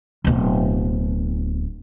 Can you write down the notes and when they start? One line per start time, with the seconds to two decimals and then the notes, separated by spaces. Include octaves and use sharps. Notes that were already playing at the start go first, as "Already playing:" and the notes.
0.24 D1 B2